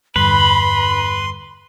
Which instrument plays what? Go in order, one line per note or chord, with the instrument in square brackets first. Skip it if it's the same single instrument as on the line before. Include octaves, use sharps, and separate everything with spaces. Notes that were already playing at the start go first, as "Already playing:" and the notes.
[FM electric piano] E2 G2 D3 [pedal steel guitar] B4 [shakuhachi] B5 [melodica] C6